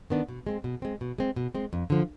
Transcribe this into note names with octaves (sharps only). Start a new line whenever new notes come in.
D#3 B3 D4
B2
G#3 C4
B2
G#3 C4
B2
G#3 C4
B2
G#3 C4
F2
D3 F3